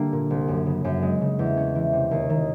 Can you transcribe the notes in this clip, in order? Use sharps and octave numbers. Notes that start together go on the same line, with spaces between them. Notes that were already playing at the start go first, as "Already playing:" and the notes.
Already playing: D3 G3 A#3 D4
A#2
C2
F#2
C#3
F#2
G#3
C#3
E2
C#4
E3
C3
D#2
D#3